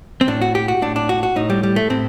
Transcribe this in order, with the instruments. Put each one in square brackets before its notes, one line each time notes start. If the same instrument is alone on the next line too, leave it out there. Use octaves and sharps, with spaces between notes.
[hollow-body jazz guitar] C4
A2 D4
F#4
G4
F#4
A2 D4
D4
F#4
F#4
A2 D#4
G3
G3
A3
A2 C4